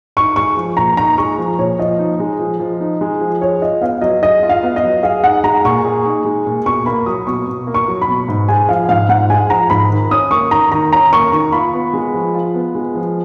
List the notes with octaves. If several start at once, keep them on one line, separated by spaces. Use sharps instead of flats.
D#4 C#6
G#3 C#6
F3
A#2 A#5
D#4 A#5
G#3 C#6
F3
A#2 C#5
F3 D#5
D#4
G#3
F3
F3
D#4
G#3
F3
G#4 C#5
F4 D#5
B3 F5
F#3 D#5
G#4 D#5
F4
F5
B3
D#5
F#3
G#4 F5
D#4 F#5
G#3 A#5
A#2 C#6
G#4
D#4
G#3
A#2
B2 C#6
A#3 B5
F#3 D#6
B2 C#6
B2
A#3
C#6
F#3
B5
B2
G#2
G#3 G#5
F3 F5
G#2 F5
G#2 F#5
G#3 G#5
F3 A#5
G#2 B5
D#3
C#4 D#6
A#3 C#6
D#3 A#5
D#3 A#5
C#4 A#5
A#3 C#6
D#3 C#6
F4 B5
B3
G#3
F3
F4
B3
G#3
F3